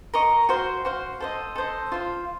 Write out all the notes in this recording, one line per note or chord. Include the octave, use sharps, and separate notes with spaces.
A#4 D#5 A#5 C#6
F#4 C5 F5
F#4 C5 F5
A4 C5 D#5
A4 C5 D#5
F4 C5 F5